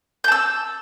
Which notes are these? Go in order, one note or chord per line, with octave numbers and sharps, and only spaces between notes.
A5 E6 G6